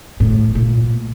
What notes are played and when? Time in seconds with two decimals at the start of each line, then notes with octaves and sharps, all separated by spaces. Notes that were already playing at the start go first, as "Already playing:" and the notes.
0.20 A2
0.55 A#2